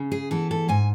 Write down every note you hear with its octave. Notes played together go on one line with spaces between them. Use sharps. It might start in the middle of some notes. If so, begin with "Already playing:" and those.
Already playing: C#3
G#4
E3 B3 A4
A4
G#2 G#5